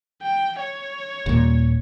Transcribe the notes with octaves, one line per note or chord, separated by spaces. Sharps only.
G5
C#5
D#1 A#2